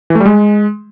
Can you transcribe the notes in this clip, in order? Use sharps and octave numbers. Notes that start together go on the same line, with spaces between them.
E3
A3
G3
G#3